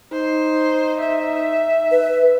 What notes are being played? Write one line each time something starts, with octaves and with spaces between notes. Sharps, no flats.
D#4 C5
E5
B4